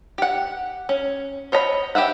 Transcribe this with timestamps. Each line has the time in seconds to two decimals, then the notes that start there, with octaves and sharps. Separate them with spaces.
0.18 G4 F#5
0.89 C#4
1.52 C5 C#5 D#5 A#5 B5
1.95 G4 B4 E5 F#5